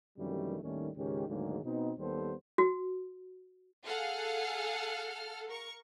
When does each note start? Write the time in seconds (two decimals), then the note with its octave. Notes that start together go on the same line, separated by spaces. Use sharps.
0.18 F#2 C3 D#3 E3 G3 A3
0.62 D#2 A2 D#3 G3 A3 C#4
0.97 C#2 G#2 D#3 C#4 G4
1.28 D2 G#2 D#3 F#3 G#3 A#3
1.64 B2 B3 C4 D#4
1.99 D#2 G3 B3 C4 A4 C5
2.58 F#4
3.86 G#4 A4 F5 F#5 F6
5.50 A#4 C#6